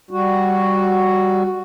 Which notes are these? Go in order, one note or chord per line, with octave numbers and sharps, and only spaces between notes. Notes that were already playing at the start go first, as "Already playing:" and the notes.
G3 F#4